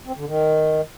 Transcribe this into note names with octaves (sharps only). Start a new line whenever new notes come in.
C4
D3
D#3